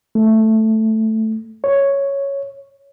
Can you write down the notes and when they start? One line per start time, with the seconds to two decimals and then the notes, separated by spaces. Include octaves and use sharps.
0.15 A3
1.64 C#5